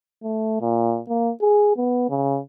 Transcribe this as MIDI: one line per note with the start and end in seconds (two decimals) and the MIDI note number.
0.24 0.60 57
0.61 1.00 46
1.08 1.31 58
1.41 1.72 68
1.77 2.08 59
2.10 2.39 49